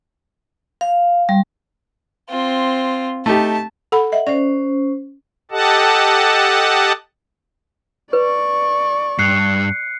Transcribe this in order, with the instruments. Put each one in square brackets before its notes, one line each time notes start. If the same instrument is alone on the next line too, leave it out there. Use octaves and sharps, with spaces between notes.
[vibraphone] F5
G3
[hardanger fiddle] C4 F4
[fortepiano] A3 D#4 G4 [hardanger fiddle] A5
[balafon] A4 F#5 B5
[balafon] D#5 E5 [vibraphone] F#5
[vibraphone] C#4 C5 [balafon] D5
[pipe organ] G4 A4 D#5 F#5 A5
[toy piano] B4 [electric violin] D5 C#6
[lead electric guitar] G2 [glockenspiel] F#6 C7 C#7